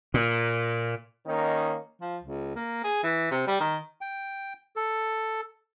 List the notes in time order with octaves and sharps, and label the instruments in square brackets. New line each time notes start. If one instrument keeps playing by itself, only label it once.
[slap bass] A#2
[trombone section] D#3 A#3 C#4 D#4
[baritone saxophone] F3
C#2
A#3
G#4
E3
C3
G3
D#3
[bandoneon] G5
A4